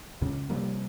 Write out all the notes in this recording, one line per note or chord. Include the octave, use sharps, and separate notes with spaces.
C#2 C#3
C3 F3 G3 A#3